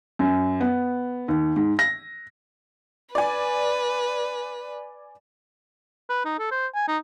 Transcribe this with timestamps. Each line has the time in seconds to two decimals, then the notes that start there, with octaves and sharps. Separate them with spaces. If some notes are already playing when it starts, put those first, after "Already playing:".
0.19 F#2
0.61 B3
1.28 D#2
1.56 G#2
1.79 A#6
3.15 B4 D5 G#5
6.10 B4
6.25 D#4
6.39 A4
6.51 C5
6.75 G#5
6.88 D#4